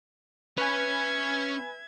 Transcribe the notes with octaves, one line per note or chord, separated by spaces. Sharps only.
C#4 B4 C#5 E5 G#5 G#6